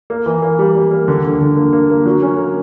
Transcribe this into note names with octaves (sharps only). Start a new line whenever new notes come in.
A#3
E3
A#3
G3
G3
A#3
D3
D3
D3
A#3
A#3
A#3
F#3
C#4
A#3